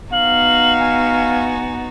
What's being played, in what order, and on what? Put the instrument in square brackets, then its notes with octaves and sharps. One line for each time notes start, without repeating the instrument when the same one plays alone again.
[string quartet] B3 D#4 F#4 [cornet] F5 [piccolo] F#7
[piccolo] G#5